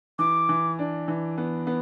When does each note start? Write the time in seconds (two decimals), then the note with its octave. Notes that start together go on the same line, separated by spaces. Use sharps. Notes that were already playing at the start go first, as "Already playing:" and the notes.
0.19 E3 D6
0.49 E3
0.79 D4
1.08 E3
1.38 B3
1.67 B3